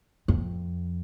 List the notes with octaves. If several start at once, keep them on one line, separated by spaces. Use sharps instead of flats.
F2